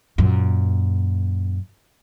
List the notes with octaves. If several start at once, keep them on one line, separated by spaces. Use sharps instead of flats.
F#2 A#2